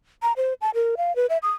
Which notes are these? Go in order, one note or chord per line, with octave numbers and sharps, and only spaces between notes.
A#5
C5
A5
A#4
F5
B4
E5
D#6